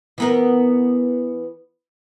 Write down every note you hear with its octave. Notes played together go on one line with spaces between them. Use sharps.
E3 B3 A#4